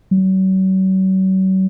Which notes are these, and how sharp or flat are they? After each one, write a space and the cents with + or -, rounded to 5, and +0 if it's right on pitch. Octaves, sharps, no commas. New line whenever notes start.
F#3 +40